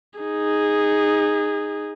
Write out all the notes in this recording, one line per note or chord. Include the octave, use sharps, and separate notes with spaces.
D#4 G#4